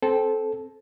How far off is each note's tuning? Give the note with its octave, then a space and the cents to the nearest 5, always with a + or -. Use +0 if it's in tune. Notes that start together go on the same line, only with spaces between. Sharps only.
C4 +0 A4 -20